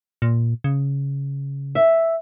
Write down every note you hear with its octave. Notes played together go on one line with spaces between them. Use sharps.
A#2
C#3
E5